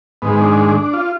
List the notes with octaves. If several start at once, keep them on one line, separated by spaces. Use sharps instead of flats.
G#2 D#3 G#3 B3
D4
F4